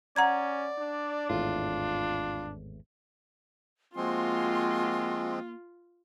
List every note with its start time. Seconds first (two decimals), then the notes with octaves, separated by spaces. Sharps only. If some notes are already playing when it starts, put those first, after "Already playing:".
0.16 C#4 D5 F#5 A#5 G#6
0.79 D4
1.30 G#1 E2 A2 F4
3.96 F3 G#3 A#3 C4 F4 F#4 G#5 C6